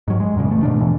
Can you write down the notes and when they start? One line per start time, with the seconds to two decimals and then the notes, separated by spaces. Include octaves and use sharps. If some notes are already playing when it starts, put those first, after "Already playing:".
0.08 G#2 F#3
0.20 G#3
0.36 F#2 A#2 C#3 G#3
0.48 A1 A3
0.63 G2 B2 D#3 D4
0.79 D#2 B2 E3